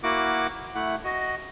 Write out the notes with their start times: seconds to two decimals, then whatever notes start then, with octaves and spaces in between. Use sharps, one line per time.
0.03 A#3 E4 F#4 F#5 D6
0.75 A3 E4 F#5
1.04 F#4 D#5